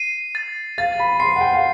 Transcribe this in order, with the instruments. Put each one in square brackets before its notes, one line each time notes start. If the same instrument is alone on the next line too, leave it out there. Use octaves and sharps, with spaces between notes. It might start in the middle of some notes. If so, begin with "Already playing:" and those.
Already playing: [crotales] C7 D#7
A6
[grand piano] F5 [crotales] A6
[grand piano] B5
[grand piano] C6 [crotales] C7
[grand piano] F#5
G5
F5